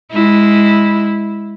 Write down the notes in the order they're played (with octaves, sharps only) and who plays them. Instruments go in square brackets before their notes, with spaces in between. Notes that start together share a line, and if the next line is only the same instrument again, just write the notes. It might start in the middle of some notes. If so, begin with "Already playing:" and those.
[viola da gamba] G#3 E4